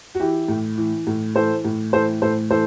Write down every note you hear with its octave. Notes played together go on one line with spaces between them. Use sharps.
F#4
E3 E4 G4
A2
E3
A2
E3 A4 C5
A2
E3 A4 C5
A2 A4 C5
E3 A4 C5